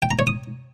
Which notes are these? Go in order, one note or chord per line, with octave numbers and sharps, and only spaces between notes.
G5
A#5
C#5
D#6